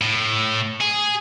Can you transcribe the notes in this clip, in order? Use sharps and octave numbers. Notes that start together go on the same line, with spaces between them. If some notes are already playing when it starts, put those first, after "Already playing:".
A2
G#4